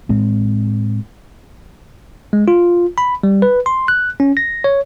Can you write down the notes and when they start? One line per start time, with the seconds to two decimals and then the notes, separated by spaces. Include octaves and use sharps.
0.09 A2 G#3 C4
2.33 G#3
2.48 F4
2.98 B5
3.23 G3
3.42 B4
3.66 C6
3.88 F#6
4.20 C#4
4.37 A#6
4.64 C#5